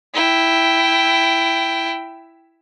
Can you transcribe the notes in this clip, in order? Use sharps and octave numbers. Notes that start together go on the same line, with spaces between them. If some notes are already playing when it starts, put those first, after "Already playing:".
E4 G5